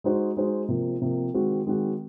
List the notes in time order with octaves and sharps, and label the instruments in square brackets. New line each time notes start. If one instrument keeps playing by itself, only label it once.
[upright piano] G#3 D#4 F#4 C5
G#3 D#4 F#4 C5
C3 F3 A#3
C3 F3 A#3
D#3 G#3 C4 F#4
D#3 G#3 C4 F#4